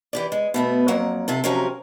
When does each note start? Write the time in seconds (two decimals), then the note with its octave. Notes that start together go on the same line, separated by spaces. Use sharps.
0.13 E3 G4 D5
0.32 G#3
0.54 B2 A3 B3
0.88 F2 F#3 A#3 F#5
1.28 C3 F4 A4
1.44 C3 F3 F#3 C#4 G4 A#4